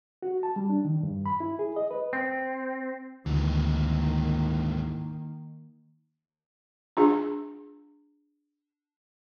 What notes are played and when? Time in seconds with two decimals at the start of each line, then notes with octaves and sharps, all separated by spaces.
0.23 F#4
0.43 A5
0.56 G3
0.69 D4
0.85 D#3
1.03 G2
1.26 B5
1.40 E4
1.59 G#4
1.76 D#5
1.91 B4
2.13 C4
3.26 D2 G#2 D#3 E3 A#3
6.97 D4 F4 G#4